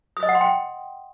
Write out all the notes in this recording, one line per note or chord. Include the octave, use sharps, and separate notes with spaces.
D#6
D#5
F#5
C6
G5